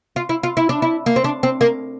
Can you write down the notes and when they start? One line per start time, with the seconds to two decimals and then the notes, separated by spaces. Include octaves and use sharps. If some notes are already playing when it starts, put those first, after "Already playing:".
0.16 F4
0.29 E4
0.43 F4
0.57 E4
0.69 D4
0.82 E4
1.06 A#3
1.16 C4
1.24 D4
1.43 C4
1.61 A#3